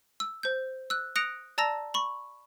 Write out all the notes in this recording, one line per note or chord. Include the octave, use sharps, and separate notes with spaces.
E6
C5 G6
E6 F#6
D#6 F#6 A#6 C#7 D7 F7
D5 A5 A#5 E6 A#6
B5 C#6